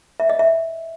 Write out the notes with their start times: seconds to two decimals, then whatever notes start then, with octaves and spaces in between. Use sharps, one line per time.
0.20 E5
0.29 D#5
0.39 E5